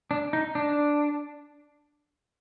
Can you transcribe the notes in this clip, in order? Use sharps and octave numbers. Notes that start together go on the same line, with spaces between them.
D4
D#4
D4